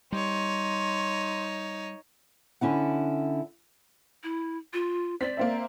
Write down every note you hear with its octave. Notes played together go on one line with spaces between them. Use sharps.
G3 D#4 C#5 C6
D3 C#4 E4 F#5
E4
F4
C4 D5 B6
A#3 C4 E5